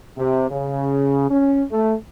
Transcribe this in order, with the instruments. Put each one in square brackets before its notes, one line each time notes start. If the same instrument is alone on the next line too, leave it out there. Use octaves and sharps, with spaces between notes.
[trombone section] C3
C#3
C#4
A3